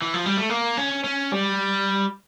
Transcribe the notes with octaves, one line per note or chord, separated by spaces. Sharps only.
E3
F3
G3
A3
A#3
C#4
C#4
G3